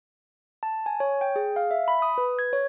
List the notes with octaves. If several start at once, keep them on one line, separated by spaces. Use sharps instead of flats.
A5
G#5
C#5
G5
G#4
F5
E5
B5
D#6
B4
G#6
C#5